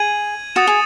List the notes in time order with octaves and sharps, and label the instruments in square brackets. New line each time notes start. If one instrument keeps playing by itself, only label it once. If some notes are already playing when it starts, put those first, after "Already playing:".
Already playing: [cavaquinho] G#4 [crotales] G#6 D#7 F#7
[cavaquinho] F#4 [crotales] D#6 A6 C#7 E7
[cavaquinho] G#4